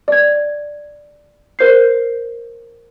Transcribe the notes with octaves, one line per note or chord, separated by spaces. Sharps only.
D5 G#6
A#4 C5 G6 C7